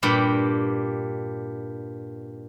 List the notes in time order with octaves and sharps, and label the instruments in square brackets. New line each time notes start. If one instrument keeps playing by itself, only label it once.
[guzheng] G2 A#2 G4 B5